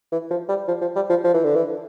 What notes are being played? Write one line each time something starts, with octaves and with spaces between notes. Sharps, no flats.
E3
F3
G3
F3
F3
G3
F3
F3
E3
D3
E3